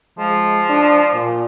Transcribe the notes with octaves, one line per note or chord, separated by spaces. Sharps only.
F3 G#3
D4
A#2